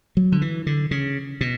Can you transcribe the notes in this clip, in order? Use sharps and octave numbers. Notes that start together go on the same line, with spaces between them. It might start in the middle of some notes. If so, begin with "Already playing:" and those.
F#3
D3
E3
D3
C#3
B2